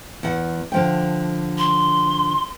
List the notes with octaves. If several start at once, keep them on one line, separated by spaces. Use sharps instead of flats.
E2 F#5
D3 F3 G5
C6